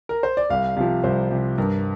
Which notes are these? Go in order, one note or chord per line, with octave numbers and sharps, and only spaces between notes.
A#4
C5
D5
C2 F5
C3 F3 F5
C2 C5
C3 F3
G2 A#4